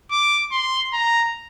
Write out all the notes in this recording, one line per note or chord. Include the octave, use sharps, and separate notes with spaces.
D6
C6
A#5